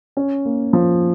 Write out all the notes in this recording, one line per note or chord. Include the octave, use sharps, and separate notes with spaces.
C#4
A#3
F3